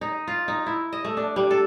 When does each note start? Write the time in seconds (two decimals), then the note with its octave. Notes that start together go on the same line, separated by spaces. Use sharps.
0.01 D#4
0.28 F4
0.48 D#4
0.66 E4
0.93 D#5
1.05 A3
1.17 D4
1.36 G3
1.51 A4